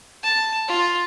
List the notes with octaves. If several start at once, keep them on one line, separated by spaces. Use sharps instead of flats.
A5
F4